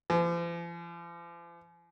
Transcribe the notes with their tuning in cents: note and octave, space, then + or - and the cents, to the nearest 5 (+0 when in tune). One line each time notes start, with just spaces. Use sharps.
F3 -45